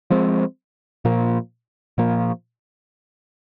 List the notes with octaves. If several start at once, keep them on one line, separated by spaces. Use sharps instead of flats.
F3 G#3 C4
A#2 F3 A#3
A#2 F3 A#3